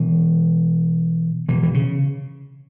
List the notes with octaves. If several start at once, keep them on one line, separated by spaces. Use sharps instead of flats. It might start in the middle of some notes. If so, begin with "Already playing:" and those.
Already playing: B2 E3
B2 E3
E3
C#3